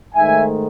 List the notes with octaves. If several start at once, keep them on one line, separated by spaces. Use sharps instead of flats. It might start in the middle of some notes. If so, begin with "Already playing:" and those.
G#2 D#3 A3 E5 G#5